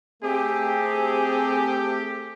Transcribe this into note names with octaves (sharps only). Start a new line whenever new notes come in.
A3 C4 G4 G#4